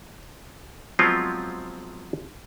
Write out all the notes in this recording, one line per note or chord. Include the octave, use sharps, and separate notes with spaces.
F3 F#3 G#3 B3 C4 F4